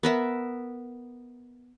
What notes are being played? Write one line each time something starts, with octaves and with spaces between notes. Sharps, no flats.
B3 A#4 E5